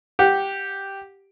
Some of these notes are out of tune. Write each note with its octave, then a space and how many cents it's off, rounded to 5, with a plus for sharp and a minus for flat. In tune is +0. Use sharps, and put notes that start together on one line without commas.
G4 +0 F#5 -10